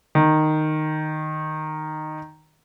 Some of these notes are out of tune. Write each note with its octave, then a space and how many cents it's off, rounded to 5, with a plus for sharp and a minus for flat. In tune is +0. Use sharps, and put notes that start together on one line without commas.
D#3 -10